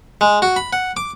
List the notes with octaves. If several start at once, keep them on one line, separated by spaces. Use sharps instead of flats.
G#3
F#4
B5
F#5
D6